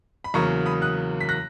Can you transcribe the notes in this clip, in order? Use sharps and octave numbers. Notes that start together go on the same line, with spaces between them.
B5
E2 C#3 F#3 A#3 A#5 C#6
B5 D#6
D#6 F#6
B6
F#6 A#6